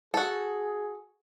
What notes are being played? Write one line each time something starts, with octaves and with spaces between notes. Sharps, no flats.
F#4 G#4 A4